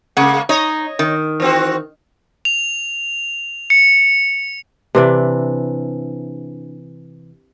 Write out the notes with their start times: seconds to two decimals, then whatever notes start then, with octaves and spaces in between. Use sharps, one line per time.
0.17 C#3 G#3 A#3 F#5
0.49 D#4 C#5 D#5
0.99 D#3
1.40 E3 C4 F#4
2.45 F7
3.70 C#7
4.95 C3 E3 D4